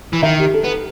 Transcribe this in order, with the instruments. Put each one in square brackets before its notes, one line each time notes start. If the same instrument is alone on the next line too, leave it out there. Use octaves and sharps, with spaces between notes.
[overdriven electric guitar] E3
[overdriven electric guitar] D#3 [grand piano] E5
[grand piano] G4
A4
[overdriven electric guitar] B3